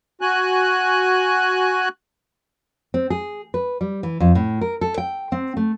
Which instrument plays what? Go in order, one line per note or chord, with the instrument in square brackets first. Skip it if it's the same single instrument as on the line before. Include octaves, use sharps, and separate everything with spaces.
[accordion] F#4 G#5 F#6
[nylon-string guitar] C4
G#4
B4
G3
E3
F2
A2
A#4
A4
G5
C4
A3